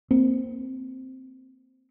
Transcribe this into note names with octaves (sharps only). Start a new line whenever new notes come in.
A#3 C4